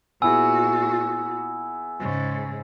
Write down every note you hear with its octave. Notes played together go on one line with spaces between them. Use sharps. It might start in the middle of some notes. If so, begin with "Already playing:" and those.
A#2 B3 E4 F#4 G#4 G#5 E6
G#2 C#3